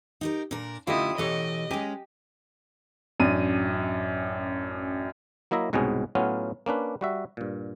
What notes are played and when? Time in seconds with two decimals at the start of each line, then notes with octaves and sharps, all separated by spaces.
0.21 D#4 G4 A#4
0.51 A#2 D4 A#4
0.87 F#2 D3 A3 E4 F4 G4 D#5 D#6
1.18 B2 E3 G4 A4 C#5 D#5
1.71 G#3 C#4 G4 G#5
3.20 A1 F#2 D4 D#7
5.51 F#3 A#3 E4 D#5 E5 A#5
5.73 C2 G#2 B2 B3 C#4 G#4
6.15 A2 F#3 B3 C#4 F4
6.66 A#3 C#4 D4 B4
7.01 G3 F#4 E5
7.37 G2 A#2